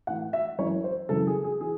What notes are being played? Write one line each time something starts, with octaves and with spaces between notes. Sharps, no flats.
A2 E3 F#5
E5
F#2 E3 C#5
C5
F#2 C#3 E3 A4
G#4
G#4
E3 G#4